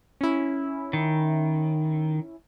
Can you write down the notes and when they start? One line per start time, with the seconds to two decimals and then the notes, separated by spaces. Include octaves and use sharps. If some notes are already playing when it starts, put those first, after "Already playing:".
0.21 C#4 E4
0.93 D#3